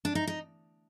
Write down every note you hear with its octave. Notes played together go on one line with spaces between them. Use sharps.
D4
D#4
D#4